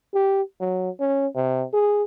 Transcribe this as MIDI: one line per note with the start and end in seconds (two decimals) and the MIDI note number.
0.14 0.42 67
0.60 0.90 54
1.00 1.27 61
1.36 1.64 48
1.73 2.03 68